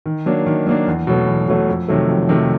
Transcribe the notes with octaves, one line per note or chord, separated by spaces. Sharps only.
D#3
F#3 A#3 D4
D#3
F#3 A#3 D4
E2
B2 F#3 A3
E2
B2 F#3 A3
F2
C3 D#3 F#3 A3
F2
C3 D#3 F#3 A3